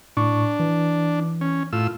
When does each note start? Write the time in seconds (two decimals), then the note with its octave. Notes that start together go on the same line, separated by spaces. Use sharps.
0.17 A2 D4 C#6
0.60 E3
1.41 C#4
1.73 A2 F4 E6